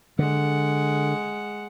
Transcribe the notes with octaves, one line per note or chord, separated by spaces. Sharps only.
D3 G#3 F#5